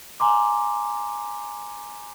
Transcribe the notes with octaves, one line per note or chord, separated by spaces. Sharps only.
G#5 A#5 C6 D6